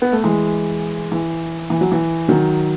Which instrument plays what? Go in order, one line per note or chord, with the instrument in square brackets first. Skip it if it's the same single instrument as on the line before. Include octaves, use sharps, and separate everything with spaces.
[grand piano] B3
A3
E3 G#3
E3
E3
F#3
E3
D#3 F#3